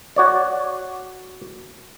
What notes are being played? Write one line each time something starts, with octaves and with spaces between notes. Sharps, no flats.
F#4 C#5 D5